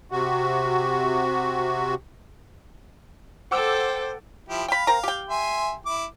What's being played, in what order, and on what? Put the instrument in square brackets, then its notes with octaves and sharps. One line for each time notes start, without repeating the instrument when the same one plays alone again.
[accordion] C3 F#4
[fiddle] A4 G5 [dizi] C5 [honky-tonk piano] F#5 D6 E6
[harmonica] F3 E4 G4
[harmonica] F5 [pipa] G5 B5
[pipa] C4 A#4 A#5
G4 G5
[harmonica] E5 G#5 C6
E4 D6